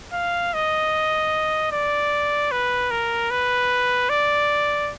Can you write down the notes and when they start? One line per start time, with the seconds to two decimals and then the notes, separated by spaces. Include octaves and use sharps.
0.13 F5
0.54 D#5
1.72 D5
2.52 B4
2.91 A#4
3.30 B4
4.10 D5